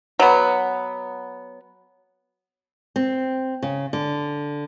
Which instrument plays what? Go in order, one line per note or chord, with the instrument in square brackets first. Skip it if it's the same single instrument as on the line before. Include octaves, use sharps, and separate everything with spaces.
[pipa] F#3 B3
[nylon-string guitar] C4
C#3
D3